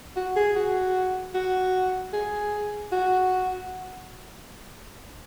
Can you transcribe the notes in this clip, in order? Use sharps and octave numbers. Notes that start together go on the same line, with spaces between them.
F#4
G#4
F#4
F#4
G#4
F#4